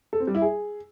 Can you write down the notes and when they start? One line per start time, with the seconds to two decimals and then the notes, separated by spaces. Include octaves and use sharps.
0.13 A4
0.20 C4
0.27 G3
0.35 E4
0.42 G#4